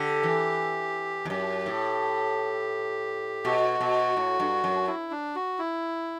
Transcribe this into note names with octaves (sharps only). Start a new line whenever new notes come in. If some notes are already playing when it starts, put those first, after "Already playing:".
Already playing: D3 G4
E3
E2
F#2 G4
A2
B2 F#4
B2
A2
G2
F#2
E4
D4
F#4
E4